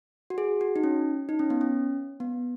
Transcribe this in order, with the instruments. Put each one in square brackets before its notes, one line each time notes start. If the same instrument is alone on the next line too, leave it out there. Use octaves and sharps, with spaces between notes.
[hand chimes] F#4
G#4
F#4
D#4
C#4
D#4
C#4
B3
C#4
B3